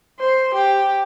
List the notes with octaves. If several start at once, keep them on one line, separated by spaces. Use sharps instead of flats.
C5
G4